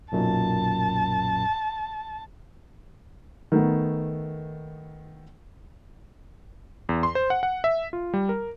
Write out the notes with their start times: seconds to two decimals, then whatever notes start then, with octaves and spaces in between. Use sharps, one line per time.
0.12 B1 F#2 A#2 A5
3.52 D#3 A3 B3
6.89 E2
7.03 C6
7.15 C5
7.30 F#5
7.43 F#5
7.64 E5
7.93 F4
8.14 G3
8.29 A#4